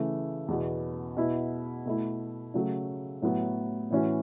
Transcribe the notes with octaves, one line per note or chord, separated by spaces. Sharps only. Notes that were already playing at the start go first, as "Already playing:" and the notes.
Already playing: C#3 E3 A3
E2 B2 B3
B2 B3 E4
B2 A3 E4
C#3 F#3 A3
A2 F#3 B3
A2 E3 C#4 F#4